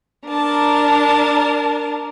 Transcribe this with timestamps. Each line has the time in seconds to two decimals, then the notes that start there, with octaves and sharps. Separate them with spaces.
0.27 D4 A#4 A5